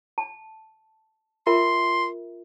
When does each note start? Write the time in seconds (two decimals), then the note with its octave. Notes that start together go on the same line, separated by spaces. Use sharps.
0.18 A5
1.47 F4 A#4 E5 C6